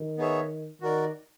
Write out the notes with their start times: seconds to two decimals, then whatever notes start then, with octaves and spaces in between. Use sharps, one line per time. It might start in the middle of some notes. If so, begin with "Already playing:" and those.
Already playing: D#3
0.17 B3 D#4 G#4 C#5 E5
0.81 D#3 F#4 A#4 D5